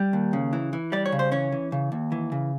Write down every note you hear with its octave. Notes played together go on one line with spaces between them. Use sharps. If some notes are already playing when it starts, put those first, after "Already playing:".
Already playing: G3
D#2
C#3
E3
E3
G3 D5
C#5
C#3
C5
E3 C#4 C#5
E3
C#3
D#2
E3
C#3